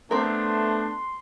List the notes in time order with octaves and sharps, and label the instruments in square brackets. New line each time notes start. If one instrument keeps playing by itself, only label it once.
[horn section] A3 B3 D4 [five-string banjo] C4 A#4 [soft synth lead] C6